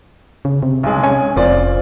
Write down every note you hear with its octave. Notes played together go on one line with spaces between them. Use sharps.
C#3
C3
B1 G#3
C#4 G#5
F1 C4 F4 D5